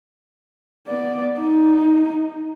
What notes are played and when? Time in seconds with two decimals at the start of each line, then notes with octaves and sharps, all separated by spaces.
0.88 B3 D5
1.39 D#4